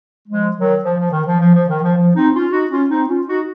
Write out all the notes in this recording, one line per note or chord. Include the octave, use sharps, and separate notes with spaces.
F3 G#3
D#3 F#3
F3
F3
D#3
F3
F3
F3
D#3
F3
F3
C4 D#4
C#4 F4
D#4 F#4
C#4 F4
C4 D#4
C#4 F4
D#4 F#4